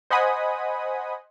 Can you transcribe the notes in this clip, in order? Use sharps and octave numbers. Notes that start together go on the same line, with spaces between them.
C5 D#5 F#5 G#5 B5 D#6